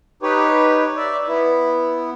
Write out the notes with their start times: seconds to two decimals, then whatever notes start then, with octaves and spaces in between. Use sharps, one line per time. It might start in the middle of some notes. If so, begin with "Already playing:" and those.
0.22 D#4 G4 B4 C#5
0.97 D5 E5
1.28 B3 E4